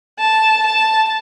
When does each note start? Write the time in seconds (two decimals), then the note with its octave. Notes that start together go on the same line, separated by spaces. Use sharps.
0.19 A5
0.66 A5